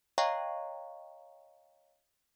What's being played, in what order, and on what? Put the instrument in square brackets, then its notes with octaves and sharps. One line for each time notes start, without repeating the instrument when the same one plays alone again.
[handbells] C#5 D#5 F5 G5 A#5 C#6